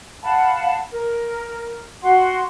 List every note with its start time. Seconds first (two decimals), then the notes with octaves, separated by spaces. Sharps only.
0.22 F5 F#5 A5 B5
0.91 A#4
2.02 F#4 F#5 C6